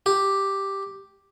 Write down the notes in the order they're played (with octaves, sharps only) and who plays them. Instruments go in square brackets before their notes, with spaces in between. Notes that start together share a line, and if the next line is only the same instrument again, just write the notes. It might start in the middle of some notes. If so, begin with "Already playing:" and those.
[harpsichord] G4